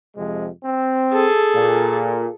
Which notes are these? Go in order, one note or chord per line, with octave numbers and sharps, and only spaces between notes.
F2 C3 G#3
C4
G#4 A4
A#2